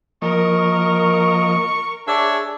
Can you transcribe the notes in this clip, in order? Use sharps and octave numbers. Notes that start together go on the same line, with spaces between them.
F3 A#3 A#4 D#5 C#6
D4 G#4 C#5 D5 E5